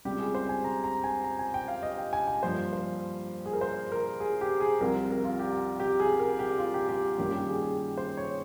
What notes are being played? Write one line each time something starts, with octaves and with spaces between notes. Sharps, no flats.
C#2 C3 G3 G4
G#4
C5
G#5
A#5
A#5
G#5
A#5
G#5
G5
F5
D#5
G5
G#5
G#5
G2 F3 A#3 C5
C5
G#4
A#4
C5
A#4
G#4
G4
G#4
C2 C3 F3 A#4
A#4
F4
G4
G4
G#4
A#4
G4
F4
G4
G4
G2 D#3 A#3 C#4 F4 G4
G4
G#4
G#4
C5
C#5